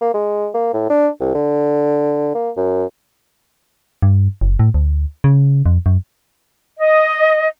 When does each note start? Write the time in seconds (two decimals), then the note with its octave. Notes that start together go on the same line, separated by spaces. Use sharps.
0.01 A#3
0.14 G#3
0.54 A#3
0.73 A2
0.90 D4
1.20 C2
1.35 D3
2.35 A#3
2.57 F#2
4.02 G2
4.41 F#1
4.59 A2
4.74 D2
5.24 C#3
5.66 F2
5.86 F#2
6.78 D#5